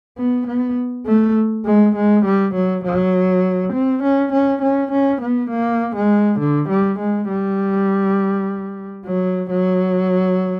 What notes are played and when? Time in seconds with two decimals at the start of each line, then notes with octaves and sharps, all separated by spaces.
0.17 B3
0.47 B3
1.06 A3
1.65 G#3
1.95 G#3
2.25 G3
2.54 F#3
2.84 F#3
3.73 C4
4.03 C#4
4.32 C#4
4.62 C#4
4.91 C#4
5.21 B3
5.50 A#3
5.95 G#3
6.39 D3
6.69 G3
6.99 G#3
7.28 G3
9.06 F#3
9.50 F#3